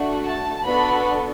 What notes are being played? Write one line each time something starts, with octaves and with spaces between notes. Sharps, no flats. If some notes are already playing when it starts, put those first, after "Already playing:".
Already playing: A3 D4 F#4
A5
B3 D4 F#4 A4 B5